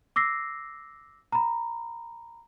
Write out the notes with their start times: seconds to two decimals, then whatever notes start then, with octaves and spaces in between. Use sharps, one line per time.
0.16 D6 E6 A#6 C7
1.32 A#5 B5